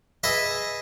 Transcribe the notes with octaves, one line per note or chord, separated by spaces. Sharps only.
G#4 B4 D#5 E5